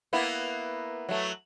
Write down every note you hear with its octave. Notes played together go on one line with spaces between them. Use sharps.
A#3 B3 E4
F#3 A3